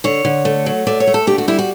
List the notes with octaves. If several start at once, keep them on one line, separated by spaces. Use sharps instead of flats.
D3 C#5
D3
A3
F#3
A3 D5
C#5
A3
A4
D3 G4
F#4
G3 E4
F#4